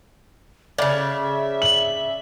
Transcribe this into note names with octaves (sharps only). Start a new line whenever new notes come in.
A2 C#3 D5 E5
F#7